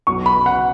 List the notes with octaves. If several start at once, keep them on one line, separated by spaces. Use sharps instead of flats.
B1 B2 F#3 C#6
B5
F#5